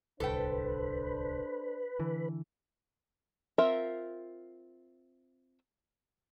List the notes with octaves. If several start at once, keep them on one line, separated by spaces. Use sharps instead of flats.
D1 C2 D4 A4 B4 C5 G5
D3 E3
C4 F4 A#4 E5